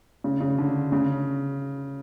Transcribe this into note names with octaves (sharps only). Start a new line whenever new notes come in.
C#3
C#3
D3
C#3